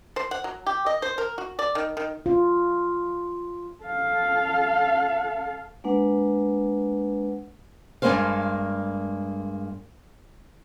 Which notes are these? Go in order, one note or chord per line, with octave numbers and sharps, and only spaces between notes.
C5
F#5
F#3
G4
D#5
C5
A#4
F#4
D5
D#3
D#3
F4
A4 F5
G#3 A#3 D4 B4 F#5
G2 E3 G#3 A#3 C5 F5